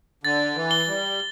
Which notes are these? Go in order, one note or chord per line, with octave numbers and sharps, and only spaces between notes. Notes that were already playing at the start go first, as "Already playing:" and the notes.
D3 A6
E3
G7
G3